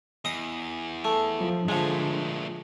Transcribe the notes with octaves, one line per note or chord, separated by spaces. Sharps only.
E2 D#5 D#6
A3
F3
A#2 D3 F3 G#3 A3